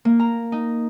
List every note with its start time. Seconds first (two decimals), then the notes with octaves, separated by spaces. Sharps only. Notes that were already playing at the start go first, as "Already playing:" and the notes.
0.05 A#3
0.20 A#5
0.52 D#4